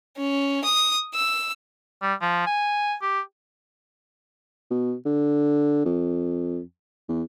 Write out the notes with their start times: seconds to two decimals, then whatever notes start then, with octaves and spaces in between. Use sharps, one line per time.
0.18 C#4
0.64 D#6
1.15 E6
2.02 G3
2.21 F3
2.46 G#5
3.02 G4
4.71 B2
5.05 D3
5.85 F2
7.09 E2